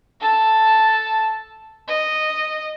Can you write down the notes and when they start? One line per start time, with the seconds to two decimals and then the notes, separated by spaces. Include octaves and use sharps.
0.20 A4 A5
1.88 D#5